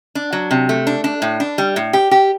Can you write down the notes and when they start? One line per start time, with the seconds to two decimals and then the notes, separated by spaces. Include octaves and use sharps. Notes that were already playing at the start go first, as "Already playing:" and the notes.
0.15 D4
0.33 F#3
0.51 C3
0.69 A3
0.87 D4
1.04 D4
1.22 A2
1.40 D4
1.58 G3
1.76 A2
1.93 G4
2.11 G4